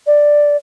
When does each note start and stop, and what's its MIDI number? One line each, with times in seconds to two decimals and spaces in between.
0.07 0.56 74